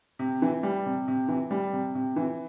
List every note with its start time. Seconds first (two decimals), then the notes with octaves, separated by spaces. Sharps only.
0.19 C3
0.42 E3
0.63 G3
0.86 C3
1.08 C3
1.28 E3
1.51 G3
1.73 C3
1.95 C3
2.16 E3